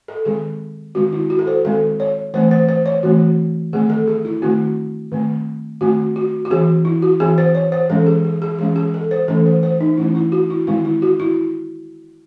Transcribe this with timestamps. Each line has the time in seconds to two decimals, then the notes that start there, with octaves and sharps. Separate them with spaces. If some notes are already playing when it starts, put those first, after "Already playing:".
0.08 A4
0.25 D#3 G#3 C4 G#4
0.95 D#3 G#3 C4 F#4
1.13 E4
1.30 F#4
1.39 A4
1.47 C5
1.64 D#3 G#3 C4 A4
2.00 C#5
2.34 E3 A3 C4 C5
2.51 C5
2.69 C5
2.86 C#5
3.03 E3 A3 C4 F#4
3.73 D#3 A3 C4 G#4
3.90 A4
4.07 G#4
4.25 E4
4.42 D#3 A3 C4 F#4
5.12 D#3 A3 C4
5.81 D#3 A3 C4 F#4
6.16 F#4
6.45 F#4
6.50 E3 C4 G#4
6.85 E4
7.02 F#4
7.20 E3 C4 G#4
7.38 C5
7.55 C#5
7.72 C5
7.90 E3 G#3 C#4 A4
8.07 G#4
8.25 G#4
8.42 G#4
8.59 E3 G#3 C#4 G#4
8.76 G#4
8.94 A4
9.11 C5
9.28 E3 A3 C#4 A4
9.46 C5
9.63 C5
9.81 D#4
9.97 E3 A3 C#4 E4
10.15 E4
10.32 F#4
10.50 E4
10.67 D#3 G#3 C4 E4
10.85 E4
11.02 F#4
11.20 E4